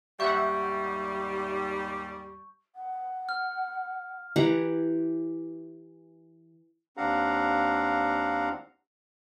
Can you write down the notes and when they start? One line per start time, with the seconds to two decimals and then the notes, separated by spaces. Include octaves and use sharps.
0.20 D#2 G#2 G3 E5 F#5 C#6 G6
2.75 F#5
3.29 F6
4.36 E3 G4 F#5 A#5
6.97 D#2 C4 D4 F5 F#5 A#5